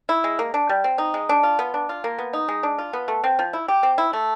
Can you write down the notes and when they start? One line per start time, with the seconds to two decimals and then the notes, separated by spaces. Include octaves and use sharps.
0.09 E4
0.24 G#3
0.39 A#3
0.54 D4
0.69 G3
0.84 C4
0.98 D#4
1.14 G#3
1.29 D4
1.43 F4
1.59 B3
1.74 D4
1.89 F4
2.04 A#3
2.19 B3
2.33 D#4
2.48 G#3
2.63 D4
2.78 F4
2.93 B3
3.08 A3
3.24 C4
3.39 F3
3.53 E4
3.68 G4
3.83 C4
3.98 E4
4.13 A3